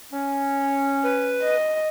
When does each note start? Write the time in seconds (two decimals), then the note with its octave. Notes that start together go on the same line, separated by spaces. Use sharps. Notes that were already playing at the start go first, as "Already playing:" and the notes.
0.12 C#4
1.04 B4
1.42 D#5